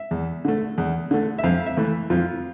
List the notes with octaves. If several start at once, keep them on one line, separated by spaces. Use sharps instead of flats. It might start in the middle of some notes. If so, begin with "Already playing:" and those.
Already playing: E5
E2
D3 A3
E2
D3 A3
E5
F2 F5
E5
E3 A3
F2 F4